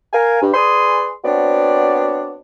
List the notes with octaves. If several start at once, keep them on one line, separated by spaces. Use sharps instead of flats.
A#4 F5 G#5
G2
G#4 B4 D5 G#5 C6 D#6
B3 C4 D4 F#4 C#5 D5